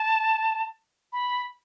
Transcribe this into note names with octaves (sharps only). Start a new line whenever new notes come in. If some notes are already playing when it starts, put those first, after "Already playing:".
Already playing: A5
B5